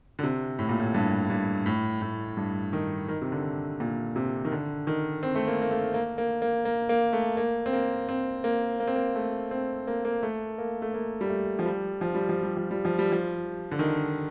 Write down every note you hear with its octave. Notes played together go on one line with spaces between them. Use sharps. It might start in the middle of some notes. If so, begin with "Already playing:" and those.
D3
C3
A2
A#2
A2
G2
G2
A2
A2
G2
D#3
D#3
C3
D3
A#2
C3
D#3
D3
D#3
C4
A3
A#3
A#3
A3
A#3
A#3
A#3
A#3
A#3
A3
A#3
C4
A#3
C4
A#3
A#3
C4
A#3
A3
C4
A#3
A#3
A3
A#3
A3
A#3
G3
A3
F3
G3
F3
G3
F3
G3
F3
G3
F3
G3
F3
D3
D#3